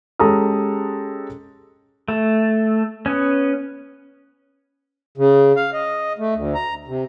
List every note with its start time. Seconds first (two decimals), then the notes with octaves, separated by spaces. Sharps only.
0.19 G#3 C#4 G4 A4 A#5 D#6
2.08 A3
3.06 B3 C#4
5.18 C#3
5.56 F5
5.73 D#5
6.19 A3
6.35 D2
6.54 A#5
6.87 C3